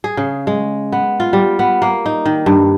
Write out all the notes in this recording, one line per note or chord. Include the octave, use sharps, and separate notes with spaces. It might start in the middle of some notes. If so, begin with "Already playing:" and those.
G#4
C#3
G#3
B3
F4
G3
B3
A#3
D#4
D#3
G2